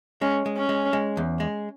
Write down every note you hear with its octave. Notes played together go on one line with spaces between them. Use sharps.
G#3 C#4
G#3
C#4
G#3
G#3
E2
G#3